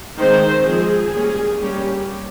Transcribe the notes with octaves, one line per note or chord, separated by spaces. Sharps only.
D#3 G#3 C4 C5
F3 G#3 C4 G#4
G3 A#3 C#4
G3 A#3 C#4 G4